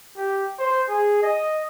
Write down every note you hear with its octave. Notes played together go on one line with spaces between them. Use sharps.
G4
C5
G#4
D#5